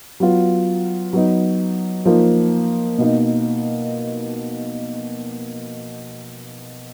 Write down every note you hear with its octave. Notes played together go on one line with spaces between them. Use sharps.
F#3 B3 F4
F#3 B3 D#4
F3 A#3 D#4
B2 A#3 D#4